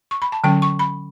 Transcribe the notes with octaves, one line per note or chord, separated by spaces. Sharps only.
C#6
B5
A5
D3 F#3 C#4 G5
C#6
B5